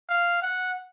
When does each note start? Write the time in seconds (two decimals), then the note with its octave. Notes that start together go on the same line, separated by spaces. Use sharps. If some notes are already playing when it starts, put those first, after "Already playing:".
0.09 F5
0.42 F#5